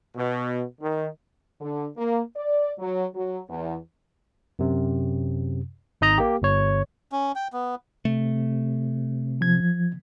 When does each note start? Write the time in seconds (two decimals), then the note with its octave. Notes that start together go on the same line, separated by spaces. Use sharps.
0.16 B2
0.81 D#3
1.61 D3
1.98 A#3
2.36 D5
2.79 F#3
3.15 F#3
3.49 E2
4.59 F#2 C3
6.01 G#1 D#4 D#5 A#5
6.18 A#3 G4
6.42 G1 C#5
7.12 C#4
7.35 G5
7.53 B3
8.05 C3 A3
9.41 F3 G#6